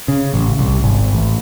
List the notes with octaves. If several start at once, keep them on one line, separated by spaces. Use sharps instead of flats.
C#3
A1
C2
G#1
A1